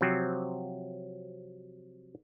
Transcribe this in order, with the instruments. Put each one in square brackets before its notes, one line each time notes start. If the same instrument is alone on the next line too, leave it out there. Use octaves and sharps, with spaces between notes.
[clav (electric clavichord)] C3 F3 F#3 C4